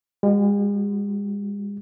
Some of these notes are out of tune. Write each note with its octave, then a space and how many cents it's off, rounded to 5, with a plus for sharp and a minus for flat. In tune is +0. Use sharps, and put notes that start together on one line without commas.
G#3 -45 F#4 +0